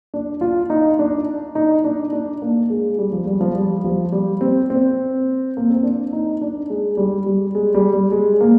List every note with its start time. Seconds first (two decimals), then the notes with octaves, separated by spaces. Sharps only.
0.14 D4
0.41 F4
0.70 D#4
0.99 D4
1.55 D#4
1.84 D4
2.13 D4
2.42 A#3
2.70 G#3
2.98 G3
3.13 F3
3.27 G3
3.41 F3
3.55 G3
3.84 F3
4.12 G3
4.41 C4
4.70 C4
5.57 A#3
5.70 C4
5.83 D4
6.13 D#4
6.41 D4
6.70 G#3
6.97 G3
7.26 G3
7.55 G#3
7.74 G3
7.93 G3
8.12 G#3
8.41 A#3